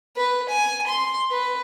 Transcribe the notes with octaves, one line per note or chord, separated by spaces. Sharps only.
B4
G#5
C6
B4